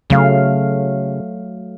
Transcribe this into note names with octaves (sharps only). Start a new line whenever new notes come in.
C#3 F#3 A3 F5